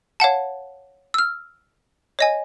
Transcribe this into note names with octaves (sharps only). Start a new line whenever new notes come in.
C#5 F5 F#5 A5
E6 F6
C#5 D#5 G#5